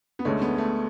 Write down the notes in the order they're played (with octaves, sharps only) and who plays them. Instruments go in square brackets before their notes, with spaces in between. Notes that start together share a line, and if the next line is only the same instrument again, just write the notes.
[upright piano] B3
[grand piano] D2 D3 G#3 C#4 [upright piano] A3
[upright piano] B3
A3